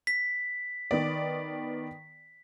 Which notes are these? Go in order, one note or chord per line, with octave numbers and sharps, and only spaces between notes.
B6
D#3 B3 D5